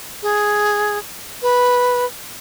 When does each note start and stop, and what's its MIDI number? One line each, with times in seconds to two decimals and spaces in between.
0.23 0.98 68
1.42 2.05 71